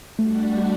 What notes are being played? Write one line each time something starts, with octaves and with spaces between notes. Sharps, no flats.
G3 A3 D4 F#4